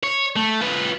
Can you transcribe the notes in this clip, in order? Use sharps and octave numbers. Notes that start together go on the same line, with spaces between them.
C#5
A3
F4 B4